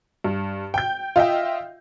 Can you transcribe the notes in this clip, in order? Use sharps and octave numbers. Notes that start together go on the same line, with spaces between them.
G2
G5 G6
F4 D#5 E5 G5